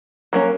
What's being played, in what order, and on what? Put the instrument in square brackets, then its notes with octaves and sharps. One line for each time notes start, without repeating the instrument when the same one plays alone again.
[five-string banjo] F#3 A#3 C#4